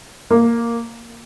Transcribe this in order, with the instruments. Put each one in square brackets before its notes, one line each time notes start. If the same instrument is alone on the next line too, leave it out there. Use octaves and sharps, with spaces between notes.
[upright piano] A#3